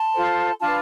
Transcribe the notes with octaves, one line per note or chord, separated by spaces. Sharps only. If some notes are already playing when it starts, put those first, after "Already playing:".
Already playing: A5 C6
F4 A4 C5
D4 F4 B4 F5 A5